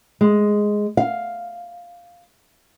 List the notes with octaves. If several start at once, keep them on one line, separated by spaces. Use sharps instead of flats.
G#3
F5